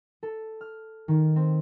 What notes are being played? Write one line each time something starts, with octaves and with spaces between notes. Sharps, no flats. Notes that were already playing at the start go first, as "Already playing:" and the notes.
A4
F6
D#3
C4